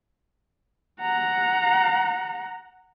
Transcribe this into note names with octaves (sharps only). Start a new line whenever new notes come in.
F#5 A#5